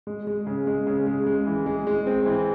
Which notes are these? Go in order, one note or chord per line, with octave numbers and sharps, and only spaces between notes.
G#3
G#3
C#3
G#3
C#3
G#3
G#3
E3
G#3
G#3
C4
E3